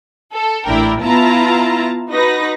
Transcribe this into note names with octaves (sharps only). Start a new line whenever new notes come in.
A4
A1 D4 E4 A#4 G5
B3 E4 F4 A5 A#5
D#4 F#4 B4 A#6